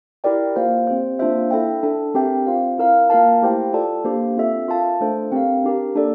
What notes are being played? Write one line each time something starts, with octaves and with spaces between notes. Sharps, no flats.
E4 G4 A#4 D5 G5
A#3 F4 C5 F5
C4 G4 C5
A#3 D4 F4 C5 E5
E4 A4 E5 G5
D4 A4 E5 A5
C4 G4 A#4 E5 G5
C4 F4 C5 F5
E4 A#4 F5
A#3 F4 A#4 F5 A5
A3 E4 G4 C5 G5
F4 A4 D5 A5
A#3 D4 G4 C5
C4 F4 A4 E5
F4 A#4 F5 A5
A3 D4 A4 C5
C4 G4 A#4 F5
D4 G4 A#4
A#3 D4 A4 D5